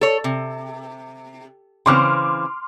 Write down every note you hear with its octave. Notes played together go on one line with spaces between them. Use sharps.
A4 C#5
C3
C#3 E3 C4 C6 D6 F6